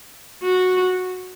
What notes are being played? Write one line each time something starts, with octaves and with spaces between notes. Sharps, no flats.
F#4